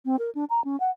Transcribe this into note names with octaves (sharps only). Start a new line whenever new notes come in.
C4
A#4
D4
A#5
C#4
F#5